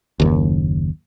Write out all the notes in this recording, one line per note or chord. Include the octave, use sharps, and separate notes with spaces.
F#1 D#2